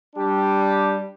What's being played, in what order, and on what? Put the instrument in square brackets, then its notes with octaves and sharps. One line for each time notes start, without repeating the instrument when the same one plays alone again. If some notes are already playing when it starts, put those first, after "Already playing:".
[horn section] G3 D4 G4